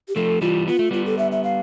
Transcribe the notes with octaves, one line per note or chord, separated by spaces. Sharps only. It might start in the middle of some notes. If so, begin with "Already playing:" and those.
G4
F3 A3 A4
E3 G3 F4
B3 F4
A3
G3 B3 F4
A4
E5
E5
F5